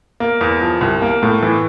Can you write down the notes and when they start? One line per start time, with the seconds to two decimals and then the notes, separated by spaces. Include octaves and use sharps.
0.20 A#3
0.41 E2
0.62 F3
0.81 C2
1.02 A#3
1.23 A2
1.43 E3